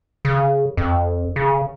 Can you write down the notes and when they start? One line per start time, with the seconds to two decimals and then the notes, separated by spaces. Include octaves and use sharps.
0.25 C#3
0.77 F2
1.36 C#3